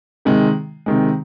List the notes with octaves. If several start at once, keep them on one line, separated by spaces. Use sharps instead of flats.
C3 D#3 G#3
C3 D#3 G#3